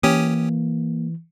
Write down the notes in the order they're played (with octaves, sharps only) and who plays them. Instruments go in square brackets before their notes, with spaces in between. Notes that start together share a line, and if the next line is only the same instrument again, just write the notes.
[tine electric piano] E3 [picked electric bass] A#3 [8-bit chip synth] C#4 G4 D#6